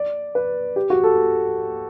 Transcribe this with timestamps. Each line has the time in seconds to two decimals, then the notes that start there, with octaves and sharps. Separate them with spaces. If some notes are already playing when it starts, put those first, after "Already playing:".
Already playing: D5
0.35 B4
0.76 G4
0.90 F#4
1.04 A4